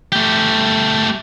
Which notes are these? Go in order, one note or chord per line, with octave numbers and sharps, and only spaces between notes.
A3 G4